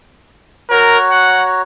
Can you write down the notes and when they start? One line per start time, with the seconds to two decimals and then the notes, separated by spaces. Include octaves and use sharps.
0.70 F#4 A#4 C#5 A#5
1.11 F#5